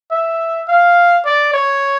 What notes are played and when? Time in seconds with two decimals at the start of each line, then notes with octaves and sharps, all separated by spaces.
0.11 E5
0.68 F5
1.25 D5
1.53 C#5